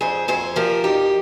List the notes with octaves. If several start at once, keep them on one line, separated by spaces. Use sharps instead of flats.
F2 G#4 C5
F2 G#4 C5
F3 G4 A#4
F2 D#4 G4